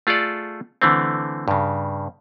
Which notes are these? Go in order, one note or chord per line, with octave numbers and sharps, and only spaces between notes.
A3 F4 G#4 A4 D5
D3 E3 A3 C4
G2 C#3